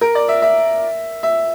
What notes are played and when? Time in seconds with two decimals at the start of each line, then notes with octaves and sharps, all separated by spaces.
0.01 A#4
0.15 D5
0.29 E5
0.42 E5
1.23 E5